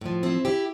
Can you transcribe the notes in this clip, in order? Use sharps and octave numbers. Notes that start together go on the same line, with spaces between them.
A2 F3
C4 E4
E4 G4